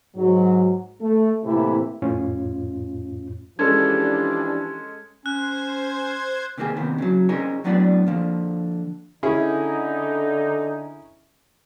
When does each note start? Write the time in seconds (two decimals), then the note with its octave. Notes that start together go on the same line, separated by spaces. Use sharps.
0.16 G#2 F#3
1.01 A3
1.45 A2 C3 E3 A#3 E4
2.02 F2 A2 C#4 F4
3.59 E3 F3 G#3 C#4 D4 G4 A4 G#6
5.26 C#4 C5 F#6 G#6
6.58 C3 D#3 A#3 C4 G#4
6.76 D#2 C3 D#3 B3
6.98 C#3 F#3
7.29 C#4 D#4 G#4 A#4 C5 C#5
7.64 A2 F#3 B3 D4 D5 F#5
8.07 D3 F3 A#3
9.23 D3 C#4 D#4 E4 G#4